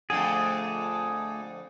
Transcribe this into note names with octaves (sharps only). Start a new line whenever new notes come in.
F2 D3 A3 G#4